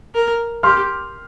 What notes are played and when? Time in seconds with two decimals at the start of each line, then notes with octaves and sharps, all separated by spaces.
0.15 A#4
0.63 G4 C6 F6